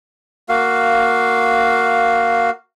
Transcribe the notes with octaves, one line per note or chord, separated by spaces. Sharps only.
A#3 F#4 F5